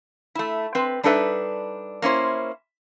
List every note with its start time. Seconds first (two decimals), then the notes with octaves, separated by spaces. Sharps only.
0.35 A3 E4
0.75 C4 B4
1.03 G3 D4 D#4 A4 B4 E5
2.02 A#3 C#4 E4 C5